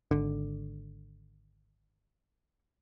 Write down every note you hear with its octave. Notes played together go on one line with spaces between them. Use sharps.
G#1 D3